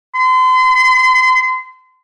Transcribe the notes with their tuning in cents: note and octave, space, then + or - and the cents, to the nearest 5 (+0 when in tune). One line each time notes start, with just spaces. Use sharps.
C6 -35